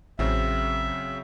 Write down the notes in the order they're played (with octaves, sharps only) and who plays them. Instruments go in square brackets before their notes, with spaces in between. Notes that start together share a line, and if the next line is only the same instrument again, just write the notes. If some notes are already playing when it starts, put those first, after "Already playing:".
[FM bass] A1 [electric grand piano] C#3 F#3 C4 [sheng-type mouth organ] E5